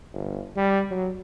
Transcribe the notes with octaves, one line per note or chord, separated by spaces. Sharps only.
G1
G3
F#3